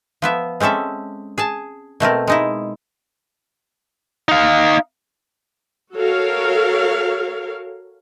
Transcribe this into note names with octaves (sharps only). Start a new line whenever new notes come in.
F3 B3 E5
G#3 C4 C#4 A4 E5
G#4 G#5 A5
B2 A3 C4 A#4
G#3 D#4 E4
D#4 F5
F#4 A4 A#4 C#5 F5